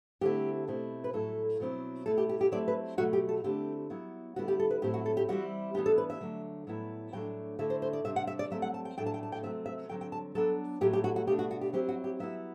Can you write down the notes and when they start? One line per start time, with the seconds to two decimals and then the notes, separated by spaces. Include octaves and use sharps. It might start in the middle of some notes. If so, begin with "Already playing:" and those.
0.21 D3 A3 C4 E4 G4
0.68 B2 A3 C4 E4
1.04 B4
1.13 A2 F#3 A3 E4 A4
1.60 B2 F#3 C4 E4
2.06 B2 A3 E4 A4
2.18 G4
2.29 G4
2.41 G4
2.52 F#3 A3 C4 E4 D5
2.68 B4
2.98 B2 F#3 A3 F#4
3.13 G4
3.29 A4
3.44 D3 A3 C4 E4 G4
3.90 F#3 B3 E4
4.36 D3 G3 B3 E4 F#4
4.48 G4
4.59 A4
4.71 B4
4.82 A2 F#3 C4 E4 G4
4.94 F#4
5.06 A4
5.17 G4
5.28 E3 G3 C4 E4 F#4
5.74 E3 B3 D4 G4
5.86 A4
5.98 B4
6.10 E5
6.21 D3 F#3 A3
6.67 A2 F#3 B3 E4
7.13 A2 F#3 A3 D4 G5
7.59 D3 A3 E4 E5
7.70 C5
7.82 C5
7.93 D5
8.04 C3 G3 D4 E5
8.16 F#5
8.27 E5
8.39 D5
8.50 F#3 A3 C4 E5
8.62 F#5
8.74 A5
8.85 G5
8.97 A2 F#3 A3 D4 G5
9.06 A5
9.14 G5
9.23 A5
9.32 G5
9.43 C3 F#3 A3 C4 E5
9.66 E5
9.89 D3 F#3 C4 G5
10.01 G5
10.12 A5
10.35 F#3 B3 D4 A4
10.81 A2 F#3 A3 G4
10.93 G4
11.04 F#4
11.16 F#4
11.27 B2 A3 D4 G4
11.39 F#4
11.51 F#4
11.61 G4
11.73 F#3 C4 E4 G4
11.89 F#4
12.04 G4
12.20 F#3 B3 E4 E5